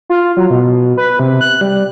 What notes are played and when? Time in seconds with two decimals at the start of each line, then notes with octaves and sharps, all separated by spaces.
0.10 F4
0.37 F#3
0.50 B2
0.97 B4
1.19 C3
1.41 F#6
1.61 G3